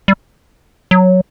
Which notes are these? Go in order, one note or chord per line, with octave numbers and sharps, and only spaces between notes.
G3
F#3